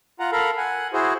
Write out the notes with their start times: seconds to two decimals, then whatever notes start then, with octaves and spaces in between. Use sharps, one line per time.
0.20 F4 F#5 A#5
0.32 A4 A#4 F5 A#5 B5
0.57 F#5 G#5
0.93 E4 F#4 G#4 C5